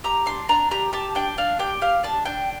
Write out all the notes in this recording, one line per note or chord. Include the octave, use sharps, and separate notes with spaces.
G4 A#5
D4 C6
D4 A#5
G4 A#5
G4 A5
D4 G5
D4 F5
G4 G5
G4 F5
D4 A5
D4 G5